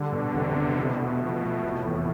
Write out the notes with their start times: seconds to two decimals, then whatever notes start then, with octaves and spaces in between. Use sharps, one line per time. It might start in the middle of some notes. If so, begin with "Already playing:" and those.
Already playing: D3 G3
0.12 B2
0.34 E1 C3
0.55 E1
0.77 B2 E4
0.99 A3
1.20 B2 F3
1.43 A3
1.63 F1 A2
1.86 E2